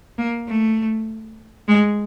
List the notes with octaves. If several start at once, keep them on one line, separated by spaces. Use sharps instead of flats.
A#3
A3
G#3